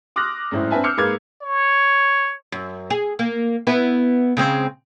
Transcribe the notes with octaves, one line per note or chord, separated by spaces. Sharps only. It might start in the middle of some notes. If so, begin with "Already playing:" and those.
C6 D6 D#6 F6 F#6 A#6
G#1 F#2 A2 E4 C5
C4 D4 B4 E5 G#5 A5
D6 E6 F6 G6 C7 C#7
G#2 A#3 B4 D6 F6 G#6
C#5
F#2
G#4
A#3
B3 E4 B4
C#3 G#3 C4